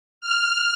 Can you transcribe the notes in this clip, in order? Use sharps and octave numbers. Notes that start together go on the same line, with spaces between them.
F6